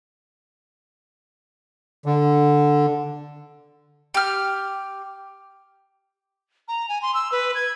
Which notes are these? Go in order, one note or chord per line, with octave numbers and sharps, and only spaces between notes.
D3
G4 F6
A#5
G#5
C6
E6
B4
G#6